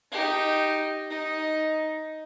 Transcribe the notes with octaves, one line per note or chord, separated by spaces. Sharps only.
D#4 G4
D#4